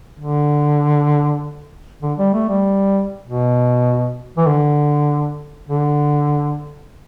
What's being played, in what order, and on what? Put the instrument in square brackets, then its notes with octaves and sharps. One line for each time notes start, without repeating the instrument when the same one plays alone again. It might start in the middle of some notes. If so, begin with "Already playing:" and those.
[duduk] D3
D3
G3
A3
G3
B2
E3
D3
D3